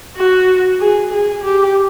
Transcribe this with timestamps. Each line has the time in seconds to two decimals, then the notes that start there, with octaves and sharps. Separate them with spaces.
0.16 F#4
0.80 G#4
1.13 G#4
1.44 G4